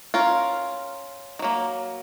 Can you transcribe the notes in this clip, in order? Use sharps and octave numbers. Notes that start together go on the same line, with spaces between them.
C#4 F4 A#4
D#3
F#3 A#3